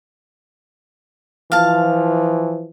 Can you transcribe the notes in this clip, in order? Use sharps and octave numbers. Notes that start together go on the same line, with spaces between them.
E3 F3 F5 A5